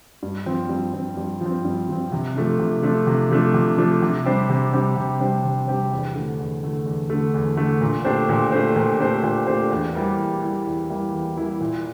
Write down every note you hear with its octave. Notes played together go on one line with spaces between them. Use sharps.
G2
F3 C4
G2
F3 C4
G2
F3
C4
G2
F3 C4
C3
F3 A3 D4
C3
F3 A3 D4
C3
F3 A3 D4
C3
F3 A3 D4
C3
G3 D4 G4 C5
C3
G3 D4 G4 C5
C3
G3 D4 G4 C5
C3
G3 D4 G4 C5
E2
D3 A3
E2
D3 A3
E2
D3 A3
E2
D3 A3
A#2
A3 D4 G4 C5
A#2
A3 D4 G4 C5
A#2
A3 D4 G4 C5
A#2
A3 D4 G4 C5
E2
E3 G3 A#3 E4
E2
E3 G3 A#3 E4
E2
E3 G3 A#3 E4
E2
E3 G3 A#3 E4
A#2